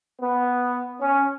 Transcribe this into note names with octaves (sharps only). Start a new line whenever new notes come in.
B3
C#4